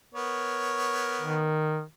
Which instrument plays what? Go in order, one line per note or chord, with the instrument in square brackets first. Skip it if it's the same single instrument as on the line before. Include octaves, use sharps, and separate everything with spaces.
[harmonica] B3 A#4 C#5
[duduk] D#3